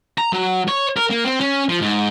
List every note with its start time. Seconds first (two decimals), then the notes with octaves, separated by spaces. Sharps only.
0.18 A#5
0.33 F#3
0.68 C#5
0.97 A#4
1.10 A#3
1.25 C4
1.41 C#4
1.69 F3
1.81 G#2